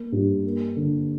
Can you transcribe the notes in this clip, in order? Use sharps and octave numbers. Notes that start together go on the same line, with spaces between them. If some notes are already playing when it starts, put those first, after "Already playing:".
Already playing: A#3
G2
A#3
D3